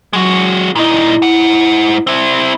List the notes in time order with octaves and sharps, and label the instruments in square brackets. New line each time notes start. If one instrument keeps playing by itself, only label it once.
[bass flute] F#3 [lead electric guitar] G#3 F#4
[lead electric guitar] A#2 D#4 [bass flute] E4
[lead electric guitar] G#2 F#5
C4 E4